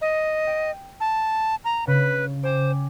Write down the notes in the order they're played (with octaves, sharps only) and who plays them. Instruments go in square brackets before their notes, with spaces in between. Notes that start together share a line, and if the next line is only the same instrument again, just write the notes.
[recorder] D#5
[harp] G5 D7 D#7
[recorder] A5
A#5
[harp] C#3 [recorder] B4
[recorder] C5 [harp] G5 G#5 D6